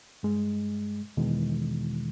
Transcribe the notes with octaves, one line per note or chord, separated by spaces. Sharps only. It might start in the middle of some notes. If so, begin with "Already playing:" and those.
G2 G#3
E2 B2 D#3 E3 G#3